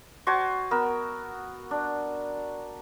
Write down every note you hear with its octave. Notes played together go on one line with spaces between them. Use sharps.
F#4 C5 G#5 A5
B3 A#4 E6
D4